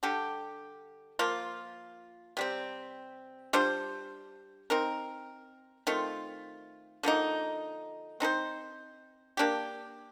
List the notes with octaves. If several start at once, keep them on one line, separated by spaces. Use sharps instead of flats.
D3 G3 D4 G4
F3 A#3 F4
C3 G3 C4
G3 D4 F4 C5
C4 D#4 A#4
D#3 A3 C4 F4
D3 F3 A#3 D#4
C4 D#4 A4 C5
A#3 D4 G4